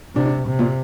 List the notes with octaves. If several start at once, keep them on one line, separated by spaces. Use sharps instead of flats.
C3 D4
D4
C3
A#2